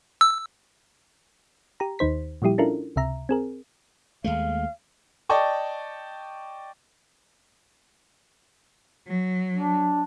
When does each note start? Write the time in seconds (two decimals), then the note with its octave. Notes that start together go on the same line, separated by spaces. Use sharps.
0.21 E6
1.80 G4 A#5
1.99 D#2 D#3 D#4 C5 B6
2.42 A#2 F3 G3 E4 G4
2.58 C#4 D4 E4 F4 A4 A#4
2.96 C#2 C3 E5 A#5
3.29 C4 G#4 A#4
4.24 D#2 G#3 A3 F5
5.29 D5 D#5 G5 A5 C#6
9.08 F#3
9.57 D4